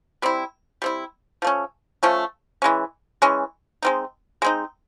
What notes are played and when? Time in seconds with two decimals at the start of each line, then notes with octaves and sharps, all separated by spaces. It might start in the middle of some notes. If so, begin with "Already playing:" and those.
0.22 G3 C4 E4
0.82 G3 C4 E4
1.42 F3 A3 C#4
2.03 F3 A3 C#4
2.62 E3 G#3 C#4
3.22 E3 G#3 C#4
3.82 G#3 C4 D#4
4.42 G#3 C4 D#4